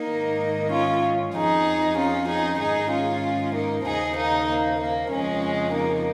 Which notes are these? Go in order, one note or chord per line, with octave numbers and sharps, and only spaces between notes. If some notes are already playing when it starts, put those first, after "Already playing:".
Already playing: A#3 D#4
G#2 D#3
C#4 F4
F2 F3 D#4 G#4
C#4 F4
D#4 G#4
G#2 D#3 D#4 G#4
C#4 F4
A#3 D#4
D#2 C#3 F3 D#4 G#4
A#3 D#4
A#3
A#3
F2 C#3 F3 G#3 C#4
A#3 D#4